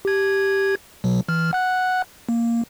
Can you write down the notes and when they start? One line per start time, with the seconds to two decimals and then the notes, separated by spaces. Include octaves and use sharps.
0.05 G4 G#6
1.04 B2 F#3
1.29 E3 F6
1.53 F#5 F#6
2.29 A#3